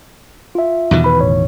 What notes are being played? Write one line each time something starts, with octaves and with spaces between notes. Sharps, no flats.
F4 E5
E2 B2 D#3
B4 B5
G1 A2 C#5